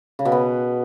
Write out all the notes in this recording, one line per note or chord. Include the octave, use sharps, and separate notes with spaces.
C#3
B2
B3